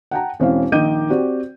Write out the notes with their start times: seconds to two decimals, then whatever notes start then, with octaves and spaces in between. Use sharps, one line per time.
0.11 F#5 G5 A5 A#5
0.40 E1 C4 C#4 E4 F5
0.72 A#1 D#3 D#5 D6 G6 D#7
1.10 C4 F#4 G4 D5